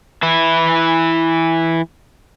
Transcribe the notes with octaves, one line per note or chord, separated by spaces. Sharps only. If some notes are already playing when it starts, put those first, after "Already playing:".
E3 E4